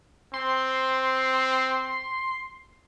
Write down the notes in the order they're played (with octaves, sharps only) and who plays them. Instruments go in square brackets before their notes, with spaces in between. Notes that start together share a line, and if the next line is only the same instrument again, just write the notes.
[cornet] C4 [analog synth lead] C6